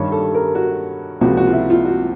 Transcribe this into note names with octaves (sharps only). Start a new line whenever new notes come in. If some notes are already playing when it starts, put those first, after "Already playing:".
Already playing: G2 D#3 G3 C#5
A4
A#4
F#4
C#2 C3 F3 A#3 F#4
F#4
F4
E4
F4
F#4